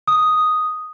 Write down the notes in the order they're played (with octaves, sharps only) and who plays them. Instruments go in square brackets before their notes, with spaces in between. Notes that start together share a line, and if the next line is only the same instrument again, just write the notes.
[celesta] D#6